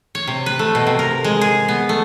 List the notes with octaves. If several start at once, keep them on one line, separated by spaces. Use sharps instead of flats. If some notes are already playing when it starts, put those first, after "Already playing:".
C#5
C3
B4
A3
B2
C3
A#4
G#3
G#4
B3
A3